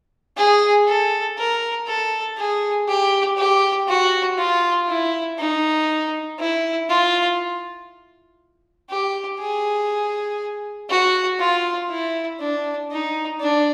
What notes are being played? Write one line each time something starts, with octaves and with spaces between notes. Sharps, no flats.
G#4
A4
A#4
A4
G#4
G4
G4
F#4
F4
E4
D#4
E4
F4
G4
G#4
F#4
F4
E4
D4
D#4
D4